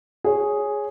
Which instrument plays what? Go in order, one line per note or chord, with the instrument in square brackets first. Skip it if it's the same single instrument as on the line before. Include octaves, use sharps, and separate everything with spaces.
[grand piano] G#4 C#5